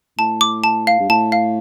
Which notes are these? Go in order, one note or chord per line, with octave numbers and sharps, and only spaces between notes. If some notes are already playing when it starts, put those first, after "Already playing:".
A2 A5
D6
A5
F5
G2
A2 A5
F5